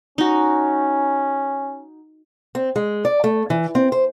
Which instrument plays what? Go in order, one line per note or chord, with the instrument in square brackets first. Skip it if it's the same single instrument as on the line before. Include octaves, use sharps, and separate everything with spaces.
[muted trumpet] C#4 [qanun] D#4 F#4
[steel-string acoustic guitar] C4
G#3
D5
A3
E3
C4
C5